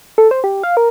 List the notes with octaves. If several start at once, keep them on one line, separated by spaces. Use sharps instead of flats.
A4
C5
G4
F5
A#4